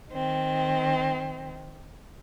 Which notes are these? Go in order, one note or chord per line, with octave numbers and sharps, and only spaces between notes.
D#3 C4